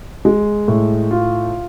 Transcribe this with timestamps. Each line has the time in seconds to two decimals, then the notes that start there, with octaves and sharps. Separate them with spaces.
0.25 G#3
0.68 A2
1.11 F4